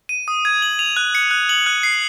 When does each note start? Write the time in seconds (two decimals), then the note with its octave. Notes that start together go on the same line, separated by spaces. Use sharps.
0.09 D#7
0.28 D#6
0.45 G#6
0.62 F#7
0.79 F7
0.97 F#6
1.15 C#7
1.31 F#6
1.49 F#7
1.66 F#6
1.83 C7